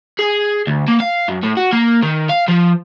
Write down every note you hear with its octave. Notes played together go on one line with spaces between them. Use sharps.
G#4
D2
A#3
F5
F#2
A2
F#4
A#3
D#3
F5
F3